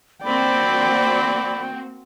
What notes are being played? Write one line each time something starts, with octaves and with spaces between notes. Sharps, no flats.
A#3 C4 F#4 D5 G5 B5